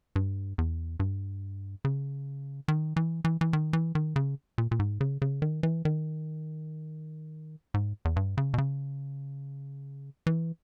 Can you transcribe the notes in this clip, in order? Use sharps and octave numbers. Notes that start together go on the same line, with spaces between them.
G2
E2
G2
C#3
D#3
E3
E3
E3
D#3
E3
D#3
C#3
A#2
A#2
G#2
C#3
C#3
D#3
E3
D#3
G#2
E2
G2
C#3
B2
C#3
E3